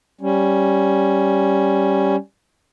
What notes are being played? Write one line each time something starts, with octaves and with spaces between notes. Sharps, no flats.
G3 C#4